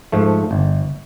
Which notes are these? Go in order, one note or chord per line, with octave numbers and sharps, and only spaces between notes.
G#2 F3 A3
G1